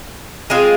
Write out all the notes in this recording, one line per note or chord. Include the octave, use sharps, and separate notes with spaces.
G#3 C4 F4 G#4